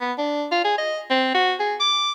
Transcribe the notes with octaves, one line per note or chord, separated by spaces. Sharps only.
B3
D4
F4
G#4
D#5
C4
F#4
G#4
D6